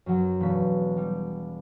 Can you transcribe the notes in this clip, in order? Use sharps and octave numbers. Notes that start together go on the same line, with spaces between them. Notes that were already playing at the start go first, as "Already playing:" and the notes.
F#2 F#3
E1 B6
G3